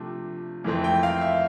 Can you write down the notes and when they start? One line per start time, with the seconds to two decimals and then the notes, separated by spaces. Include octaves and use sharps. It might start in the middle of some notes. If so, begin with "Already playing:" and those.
Already playing: C3 F3 A3 D4
0.64 F2 E3 A3 C4
0.84 G5
1.03 F5
1.21 E5